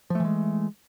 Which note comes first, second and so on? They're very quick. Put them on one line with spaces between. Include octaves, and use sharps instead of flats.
F3 A3 E3 G#3